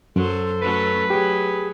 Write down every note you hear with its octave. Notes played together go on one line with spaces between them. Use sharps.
F#2 F#3 A4 C5
F#3 A3 C#4 B4
F#3 G4 G#4